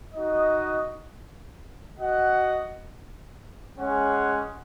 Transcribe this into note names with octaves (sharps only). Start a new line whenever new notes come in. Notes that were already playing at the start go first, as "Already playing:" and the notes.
D#4 F#4 D#5
F#4 D#5 F#5
G#3 C#4 G#4 C#5 F#5